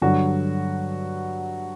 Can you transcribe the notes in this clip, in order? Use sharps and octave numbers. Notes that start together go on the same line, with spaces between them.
G2 D3 F#3 F#4